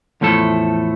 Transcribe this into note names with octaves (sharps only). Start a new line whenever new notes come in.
E2 A2 F3 A3 A4